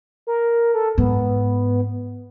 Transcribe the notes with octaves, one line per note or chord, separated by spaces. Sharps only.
A#4
A4
G#2 B3